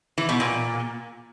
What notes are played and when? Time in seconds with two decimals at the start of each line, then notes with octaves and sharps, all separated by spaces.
0.18 E3
0.29 B2
0.40 A#2